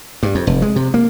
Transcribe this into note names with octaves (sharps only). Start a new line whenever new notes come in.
G2
F2
F1
G#3
C3
A#3